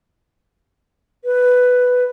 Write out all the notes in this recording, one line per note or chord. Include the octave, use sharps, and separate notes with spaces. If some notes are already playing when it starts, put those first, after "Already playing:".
B4